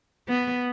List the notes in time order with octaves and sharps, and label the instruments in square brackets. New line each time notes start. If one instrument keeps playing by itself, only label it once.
[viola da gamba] B3